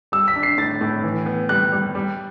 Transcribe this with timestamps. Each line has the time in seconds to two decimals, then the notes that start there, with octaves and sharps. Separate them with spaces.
0.12 G3 E6
0.28 B6
0.36 D4
0.43 C7
0.58 A2 A6
0.81 A2
1.04 E3
1.26 B3
1.49 G3 F#6
1.72 G3
1.95 G3